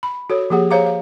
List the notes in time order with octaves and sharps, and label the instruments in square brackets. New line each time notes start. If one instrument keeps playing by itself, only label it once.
[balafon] B5
F#4 A4 C#5
F3 A#3 G4 G#4 F#5
G#4 C5 C#5 F5 A#5 D6
F5